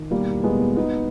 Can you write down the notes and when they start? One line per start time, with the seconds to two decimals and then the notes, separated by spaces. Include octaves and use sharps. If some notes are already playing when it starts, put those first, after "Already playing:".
Already playing: D#3
0.11 B2 G3 A#3
0.33 E2
0.44 G#3 B3
0.54 B2
0.76 B2 B3 D#4